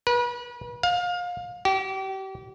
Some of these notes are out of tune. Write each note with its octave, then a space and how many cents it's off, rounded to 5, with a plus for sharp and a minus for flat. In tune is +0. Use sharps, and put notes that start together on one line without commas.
B4 -35
F5 +25
G4 -35